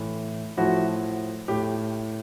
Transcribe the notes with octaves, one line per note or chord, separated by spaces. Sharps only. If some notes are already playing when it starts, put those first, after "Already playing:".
Already playing: A2 E3
A2 F3 E4 F#4
A2 G4